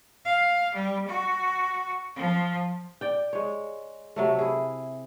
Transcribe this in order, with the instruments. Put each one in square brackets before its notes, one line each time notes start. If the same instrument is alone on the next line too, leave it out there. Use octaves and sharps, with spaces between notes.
[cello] F5
G3
F#4
F3
[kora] D5 G5
G#3 C#5
C3 F#3 A3
E4 G#4